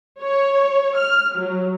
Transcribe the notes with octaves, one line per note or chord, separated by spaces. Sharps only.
C#5
F6
F#3